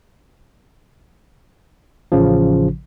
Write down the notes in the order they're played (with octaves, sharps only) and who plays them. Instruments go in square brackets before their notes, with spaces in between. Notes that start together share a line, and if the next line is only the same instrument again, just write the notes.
[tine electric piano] A1 C#3 F3